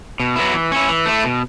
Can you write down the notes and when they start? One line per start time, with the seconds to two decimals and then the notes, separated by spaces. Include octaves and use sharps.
0.20 B2
0.36 F#3 B3 E4
0.53 E3
0.72 C#4 E4
0.89 E3
1.06 A3 E4
1.24 B2